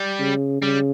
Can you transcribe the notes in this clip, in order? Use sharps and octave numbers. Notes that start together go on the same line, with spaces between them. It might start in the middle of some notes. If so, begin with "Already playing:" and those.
Already playing: G3
C#3
C#3 G3